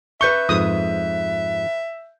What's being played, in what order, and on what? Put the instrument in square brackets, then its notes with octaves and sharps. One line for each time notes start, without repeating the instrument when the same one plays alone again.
[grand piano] B4 G6 G7 [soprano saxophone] E5 [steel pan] C#6
[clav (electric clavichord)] F2 G#2 [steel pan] D#6